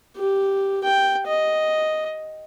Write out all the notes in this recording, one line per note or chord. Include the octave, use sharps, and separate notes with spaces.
G4
G5
D#5